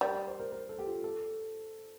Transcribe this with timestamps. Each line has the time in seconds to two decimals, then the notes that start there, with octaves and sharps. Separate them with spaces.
0.01 G3 A#4
0.14 D5
0.27 C5
0.40 A#4
0.52 A#4
0.69 A4
0.79 G4
0.87 F4
1.04 A4